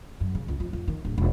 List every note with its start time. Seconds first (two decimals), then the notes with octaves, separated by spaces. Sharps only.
0.20 F#2
0.35 C#3
0.48 C#2
0.60 F2
0.73 F2
0.88 D#3
1.05 D1
1.18 E1